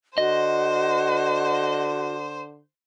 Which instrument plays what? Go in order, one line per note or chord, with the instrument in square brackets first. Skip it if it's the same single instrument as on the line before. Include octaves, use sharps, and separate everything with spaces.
[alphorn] D3 [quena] F#4 [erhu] C5 [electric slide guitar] D#5